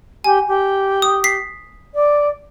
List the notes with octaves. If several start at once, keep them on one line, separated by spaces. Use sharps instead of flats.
G4 G#5
G4
D#6
B6 C7
D5